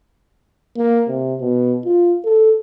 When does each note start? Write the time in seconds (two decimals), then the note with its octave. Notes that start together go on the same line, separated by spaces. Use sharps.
0.77 A#3
1.08 C3
1.40 B2
1.85 F4
2.24 A4